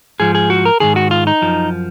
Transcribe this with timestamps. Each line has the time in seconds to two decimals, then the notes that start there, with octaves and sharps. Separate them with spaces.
0.20 G#2 F3 G#4
0.35 G#4
0.50 F#4
0.65 A#4
0.80 G#2 D#3 G#4
0.96 F#4
1.11 F4
1.27 D#4
1.42 F#2 F3